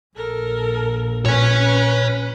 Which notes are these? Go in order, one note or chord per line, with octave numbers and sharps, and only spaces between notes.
A#1 A4 A#4
A#2 B4 C#5 G#5